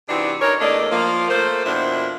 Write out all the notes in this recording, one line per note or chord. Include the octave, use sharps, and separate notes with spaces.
C3 E3 C4 D4 D#4 F#4
D4 D#4 A#4 C#5
E2 A3 A#3 D4 D5 D#5
F3 A#3
A3 A#3 C5
F2 B2 F3 A#3 D4 E4